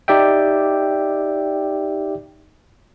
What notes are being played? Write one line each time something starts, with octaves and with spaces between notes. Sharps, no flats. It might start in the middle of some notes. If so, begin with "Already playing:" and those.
D#4 G4 D5 E5 G5